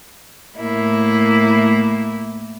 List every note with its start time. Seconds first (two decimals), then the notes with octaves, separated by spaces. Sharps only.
0.58 A2 A#3 E4